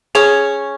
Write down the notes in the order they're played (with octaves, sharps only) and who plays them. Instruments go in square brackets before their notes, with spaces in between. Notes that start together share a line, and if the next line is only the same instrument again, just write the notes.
[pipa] C#4 [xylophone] G#4